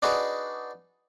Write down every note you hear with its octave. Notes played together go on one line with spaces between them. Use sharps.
D4 D#4 F#4 G#4 B4